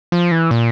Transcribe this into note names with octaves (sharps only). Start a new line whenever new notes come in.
F3
E3
A#2